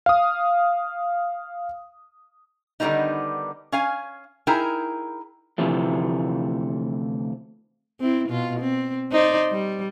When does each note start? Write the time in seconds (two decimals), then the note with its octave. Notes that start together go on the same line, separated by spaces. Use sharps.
0.06 F5 D#6
2.80 D3 D#3 G3 A#3 B3 D#4
3.72 C#4 F5 G#5
4.47 D#4 E4 G#4 A#4 G5 G#5
5.58 D2 C3 E3 F3 A3
8.01 C4 E4
8.29 B2 F4
8.60 C4
9.11 D#4 C5 D5
9.51 G3